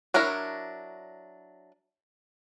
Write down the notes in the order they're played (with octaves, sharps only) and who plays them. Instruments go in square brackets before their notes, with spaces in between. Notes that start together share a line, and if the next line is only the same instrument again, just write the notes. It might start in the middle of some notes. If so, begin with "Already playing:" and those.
[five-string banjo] F#3 D4 E4 A#4 C#5